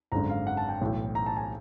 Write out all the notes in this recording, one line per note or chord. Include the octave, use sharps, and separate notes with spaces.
G#1 F#2 D3 A#5
F5
F#5
A5
G5
B1 A2 E3
A#5
A5
G#5